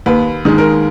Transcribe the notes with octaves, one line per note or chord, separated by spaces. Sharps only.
D#2 B4
D#3 G#3
A#4